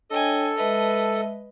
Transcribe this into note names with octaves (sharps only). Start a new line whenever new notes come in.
D4 A4 C#5 D#5 G5 G#5
G#3 B4 D#5 E5 A5